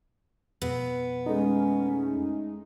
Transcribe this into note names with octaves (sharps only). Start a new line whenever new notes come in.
F2 B2 B3
G#3 A3 C#4 D#4